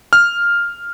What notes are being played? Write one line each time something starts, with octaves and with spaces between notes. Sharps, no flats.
F6